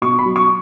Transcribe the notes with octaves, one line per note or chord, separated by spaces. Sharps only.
B2 C#6
B5
F#3
C#6